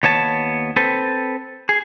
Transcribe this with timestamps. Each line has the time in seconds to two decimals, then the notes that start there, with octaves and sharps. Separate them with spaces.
0.03 D#2 B3 C#5 A5
0.76 C4 A4 B4
1.69 G#4